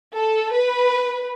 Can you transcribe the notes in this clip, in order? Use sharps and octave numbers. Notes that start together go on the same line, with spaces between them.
A4
B4